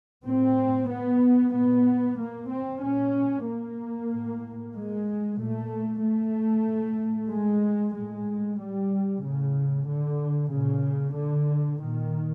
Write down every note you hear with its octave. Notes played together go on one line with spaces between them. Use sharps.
A2 C4
B3
A#2 B3
A#3
C4
A#2 C#4
A#3
A2
G#3
A#2 A3
A3
A2
G#3
A2 G#3
G3
A2 C#3
D3
A#2 C#3
D3
A#2 D#3